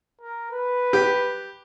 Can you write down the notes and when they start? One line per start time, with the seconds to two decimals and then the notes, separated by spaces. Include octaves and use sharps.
0.22 A#4
0.52 B4
0.93 G4